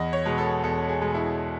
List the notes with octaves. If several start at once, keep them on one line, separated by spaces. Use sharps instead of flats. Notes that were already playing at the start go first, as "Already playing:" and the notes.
Already playing: E2 D#5
C#5
B2 G#3
A4
E2 A4
G#4
B2 G#3
E4